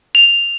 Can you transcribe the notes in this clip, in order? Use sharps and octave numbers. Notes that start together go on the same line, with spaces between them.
F7